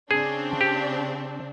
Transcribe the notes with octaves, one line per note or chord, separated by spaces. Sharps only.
C#3 C4 D4 G#4
G4